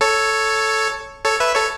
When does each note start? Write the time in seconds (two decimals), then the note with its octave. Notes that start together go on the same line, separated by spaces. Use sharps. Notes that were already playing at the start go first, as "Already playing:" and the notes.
0.01 A4 C#5
1.25 A4 C#5
1.40 B4 E5
1.55 A4 C#5